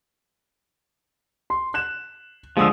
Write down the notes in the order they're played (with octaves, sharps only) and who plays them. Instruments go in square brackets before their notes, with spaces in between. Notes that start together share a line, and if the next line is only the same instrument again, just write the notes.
[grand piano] C6
F#6 E7
[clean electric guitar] D3 F3 [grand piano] G#3 D#6 E6